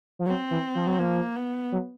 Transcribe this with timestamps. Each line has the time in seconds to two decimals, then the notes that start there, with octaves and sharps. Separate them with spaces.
0.19 F3
0.26 F#3 C4
0.51 E3
0.75 F3
0.87 F#3
0.99 F3 A#3
1.36 B3
1.72 F#3